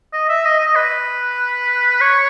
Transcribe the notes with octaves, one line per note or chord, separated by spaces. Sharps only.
D#5
E5
D#5
D#5
B4
C#5